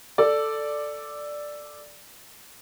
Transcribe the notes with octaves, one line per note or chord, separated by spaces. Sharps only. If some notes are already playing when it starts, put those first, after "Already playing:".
A4 D5